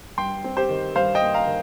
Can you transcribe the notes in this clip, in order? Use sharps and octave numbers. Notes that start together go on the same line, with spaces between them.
G2 G5 C6
C4
G4 C5
D#3
G2 C5 F5
D#5 G5
A#3
F5 A#5
D#3